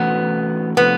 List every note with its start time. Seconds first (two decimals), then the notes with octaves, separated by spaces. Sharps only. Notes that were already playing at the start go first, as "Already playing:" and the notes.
Already playing: E3 A3 B3 C#4 F#4
0.77 C3 F3 A3 B3 C#4